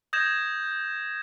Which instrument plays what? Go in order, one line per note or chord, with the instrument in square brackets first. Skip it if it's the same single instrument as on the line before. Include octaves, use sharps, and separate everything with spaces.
[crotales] D#6 G6 G#6 A#6 E7